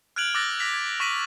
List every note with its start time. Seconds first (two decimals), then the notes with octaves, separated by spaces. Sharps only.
0.16 F6 F#6 G#6 D7 F7 F#7
0.35 D6 E6 F#6 A6 A#6
0.59 F#6 A#6 B6 F7
0.73 G#6
1.00 C#6 A#6 B6 D#7 F#7